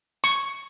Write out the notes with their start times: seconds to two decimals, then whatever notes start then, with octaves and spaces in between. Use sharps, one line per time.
0.24 C#6